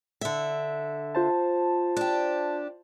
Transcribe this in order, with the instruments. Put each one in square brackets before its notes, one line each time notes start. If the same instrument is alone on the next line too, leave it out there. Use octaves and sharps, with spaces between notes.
[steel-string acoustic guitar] D3 E5
[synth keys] F4 C5 A5
[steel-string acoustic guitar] D4 G4